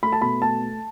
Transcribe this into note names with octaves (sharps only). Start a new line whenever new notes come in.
A3 B5
A5
B2 B5
A3 A5
A3